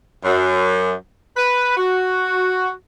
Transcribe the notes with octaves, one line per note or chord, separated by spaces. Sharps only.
F#2
B4
F#4